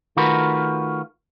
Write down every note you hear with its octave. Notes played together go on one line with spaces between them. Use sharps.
D#3 A3 F4 F#4 A#4 B4